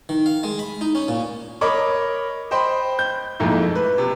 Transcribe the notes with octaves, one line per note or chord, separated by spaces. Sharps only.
D#3
F5
G#3
B5
D#4
C#4
A#2
A#4 C#5 D#5 B5 D6
C5 D#5 G5 B5 C6
G6
F2 G#2 A3 A#3 D#4 E4
B4
C3